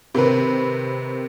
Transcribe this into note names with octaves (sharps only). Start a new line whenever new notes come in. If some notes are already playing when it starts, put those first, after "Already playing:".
C3 D#3 C4 B4